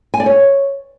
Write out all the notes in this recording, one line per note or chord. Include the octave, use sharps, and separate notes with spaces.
G#5
D5
C#5